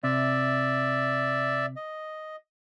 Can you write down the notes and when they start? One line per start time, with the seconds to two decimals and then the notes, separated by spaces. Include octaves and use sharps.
0.04 C3 D5 E5
1.76 D#5